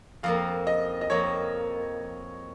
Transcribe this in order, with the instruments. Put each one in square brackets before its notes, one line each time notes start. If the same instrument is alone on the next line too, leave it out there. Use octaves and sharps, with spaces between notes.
[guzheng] F2 F3 A#3 [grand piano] F5
[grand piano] D#5
D#5
[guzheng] F2 F3 A#3 [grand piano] C#5